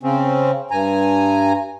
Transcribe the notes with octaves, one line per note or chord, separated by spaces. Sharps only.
C#3 C4 C#4
G2 G#5 A#5